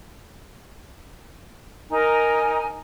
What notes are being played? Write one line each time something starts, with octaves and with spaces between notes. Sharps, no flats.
D#4 A#4 G#5 A#5